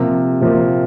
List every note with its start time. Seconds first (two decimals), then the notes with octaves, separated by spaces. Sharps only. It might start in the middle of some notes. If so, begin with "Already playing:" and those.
Already playing: C3 F3 A#3
0.41 C3 F3 A#3